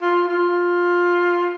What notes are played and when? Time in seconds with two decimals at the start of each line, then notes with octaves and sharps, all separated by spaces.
0.02 F4
0.27 F4